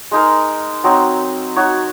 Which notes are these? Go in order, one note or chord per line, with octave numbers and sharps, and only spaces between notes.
G#3 D#4 A#4
F#3 C4 D#4
D#4 F#4 C#5